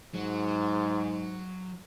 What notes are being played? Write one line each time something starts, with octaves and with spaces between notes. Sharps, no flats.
G#2 F#3